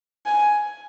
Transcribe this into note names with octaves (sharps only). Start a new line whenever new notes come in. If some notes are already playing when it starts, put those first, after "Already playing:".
G#5